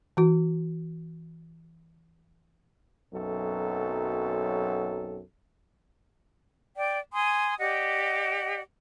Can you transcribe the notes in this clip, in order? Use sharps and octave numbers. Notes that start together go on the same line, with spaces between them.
E3 F#4
B1 F#2 F#3 C4 A4
D5 G5
G#5 C6 D#6
G4 D5 D#5 F#5